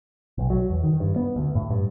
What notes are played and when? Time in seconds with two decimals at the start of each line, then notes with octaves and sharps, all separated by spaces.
0.38 B1
0.50 F#3
0.70 E2
0.83 D#3
1.00 G2
1.16 B3
1.36 D2
1.55 A2
1.71 G2